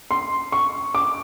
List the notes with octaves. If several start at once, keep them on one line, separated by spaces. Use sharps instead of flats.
C6
C#6
D6